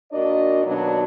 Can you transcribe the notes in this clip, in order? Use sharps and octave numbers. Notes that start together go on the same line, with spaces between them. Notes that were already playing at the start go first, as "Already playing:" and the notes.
A#2 D4 F#4 A#4 D5 D#5
D#2 B2 F#3 D4